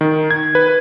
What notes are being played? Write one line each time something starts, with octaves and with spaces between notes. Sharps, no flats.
D#3
G#6
B4